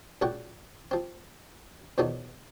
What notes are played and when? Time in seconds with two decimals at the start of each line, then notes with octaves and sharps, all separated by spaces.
0.22 C#2 A#2 F#4 F#5 G5
0.91 F3 C4
1.98 E2 B2 D#3 F3 F#3 B3